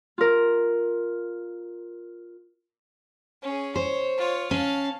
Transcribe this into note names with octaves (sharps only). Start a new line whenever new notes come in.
F4 A#4
C#4 G#4
C5 C#5
F4 C#5
C#4 F5 A5